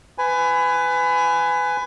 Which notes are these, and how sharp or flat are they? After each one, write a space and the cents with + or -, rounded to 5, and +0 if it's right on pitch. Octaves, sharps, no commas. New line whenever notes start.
B4 +25 G#5 +0